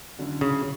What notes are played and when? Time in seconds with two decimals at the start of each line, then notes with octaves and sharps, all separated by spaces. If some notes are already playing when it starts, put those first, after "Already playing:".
0.19 D3 F#3 C#4 E4
0.41 C#3